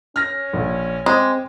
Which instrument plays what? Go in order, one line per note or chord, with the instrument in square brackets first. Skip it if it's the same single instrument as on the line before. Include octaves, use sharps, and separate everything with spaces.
[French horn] C#4 [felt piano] F6 A#6
[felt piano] A#1
[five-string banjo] G#3 [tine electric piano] C4 [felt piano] D6